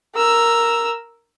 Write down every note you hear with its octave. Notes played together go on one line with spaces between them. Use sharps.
A#4 E6